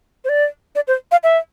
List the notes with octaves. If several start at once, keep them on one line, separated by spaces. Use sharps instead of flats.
C5
D5
D5
C5
F5
E5